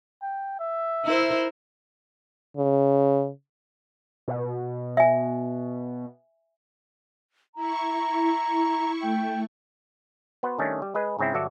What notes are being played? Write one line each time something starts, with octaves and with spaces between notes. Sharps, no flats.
G5
E5
E4 A#4 C5
C#3
B2
E5 G#5
E4 A#5 C#6
A3 G5
B3 F#4 B4 C5 F#5
D#3 G3 A3 C#4 D4
G3
G#3 G#4 B4 D#5
G#2 C#3 C4 E4
G1 F#3 F#4 A4 D5 E5